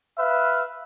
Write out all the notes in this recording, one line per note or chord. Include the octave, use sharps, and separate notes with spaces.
B4 E5 F5